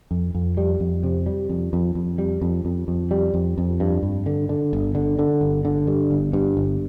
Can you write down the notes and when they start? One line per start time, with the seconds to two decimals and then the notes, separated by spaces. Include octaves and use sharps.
0.11 F2
0.35 F2
0.57 G3
0.80 F2
1.03 C3
1.26 G3
1.49 F2
1.73 F2
1.95 F2
2.18 G3
2.42 F2
2.65 F2
2.88 F2
3.11 G3
3.34 F2
3.58 F2
3.80 G2
4.03 G2
4.26 D3
4.49 D3
4.73 G1
4.95 D3
5.19 D3
5.41 G1
5.65 D3
5.87 G2
6.11 G1
6.33 G2
6.57 G1